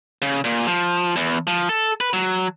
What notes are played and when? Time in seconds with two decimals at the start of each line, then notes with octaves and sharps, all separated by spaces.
0.22 C#3
0.44 A#2
0.67 F3
1.16 E2
1.47 F3
1.69 A4
2.01 B4
2.13 F#3